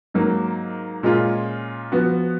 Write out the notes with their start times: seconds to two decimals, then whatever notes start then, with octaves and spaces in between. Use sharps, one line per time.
0.14 G#2 F#3 A#3
1.03 A#2 G#3 C#4 F4
1.92 F3 B3 F#4